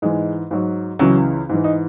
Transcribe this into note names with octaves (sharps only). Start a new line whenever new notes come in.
G#2 E3 G#3
G#2 F#3
C#2 C#3 E3 F#3
G#2 E3
D#4